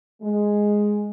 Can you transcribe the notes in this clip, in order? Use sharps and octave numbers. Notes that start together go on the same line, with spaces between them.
G#3